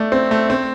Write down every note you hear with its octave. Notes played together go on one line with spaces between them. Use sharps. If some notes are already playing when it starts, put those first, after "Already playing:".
Already playing: A3 D5
C4
A3
C4